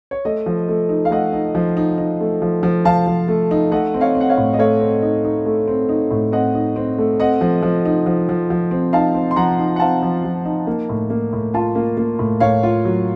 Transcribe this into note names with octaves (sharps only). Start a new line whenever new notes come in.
C#5
A3 D#5
F3
A3
D#4
F5
A3 D#5 F#5
D#4
F3
D#4
D#4
A3
F3
F3
F3 F5 A5
F3
A3
D#4
A3 D#5 F#5
C4
C#5 F5
C4
F#5
C#5 F5
A2
D#5
A3 C#5 F5
C4
D#4
D#4
A3
C4
D#4
A2
C4 D#5 F#5
D#4
C4
A3
C4 D#5 F#5
F3
F3
D#4
F3
F3
F3
C4
D#4 F5 A5
C4
C6
F3 F#5 A#5
D#4
F#5
C4 F5 A5
F3
F3
D#4
A#3
A2
A#3
A2
F4 F5 A5
A#3
A#3
A2
A2 C#5 F5
F4
F#3